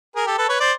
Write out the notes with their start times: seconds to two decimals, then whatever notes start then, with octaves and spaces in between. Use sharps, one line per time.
0.16 G#4 A#4
0.26 G4 A4
0.38 A4 B4
0.48 B4 C#5
0.60 C5 D5